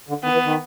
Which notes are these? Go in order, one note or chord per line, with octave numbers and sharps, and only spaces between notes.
D3
D#3 B3
E3
D#3